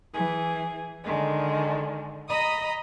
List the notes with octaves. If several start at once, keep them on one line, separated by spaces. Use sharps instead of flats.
E3 G#4
D3 D#3 G#3
D#5 A#5 B5 D#6